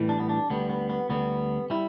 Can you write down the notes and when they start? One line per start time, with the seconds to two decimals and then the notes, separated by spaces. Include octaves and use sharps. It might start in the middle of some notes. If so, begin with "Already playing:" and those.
Already playing: A2 E3 G3
0.09 D4
0.19 B3
0.29 D4
0.50 D2 D3 G3 B3
0.70 B3
0.90 B3
1.09 D2 D3 G3 B3
1.70 G3 E4